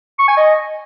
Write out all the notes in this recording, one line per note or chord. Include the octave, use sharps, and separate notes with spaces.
C#6
G#5
D#5